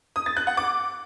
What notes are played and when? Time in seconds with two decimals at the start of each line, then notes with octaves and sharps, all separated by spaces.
0.16 D#6
0.26 A6
0.37 F#6
0.47 F#5
0.57 D6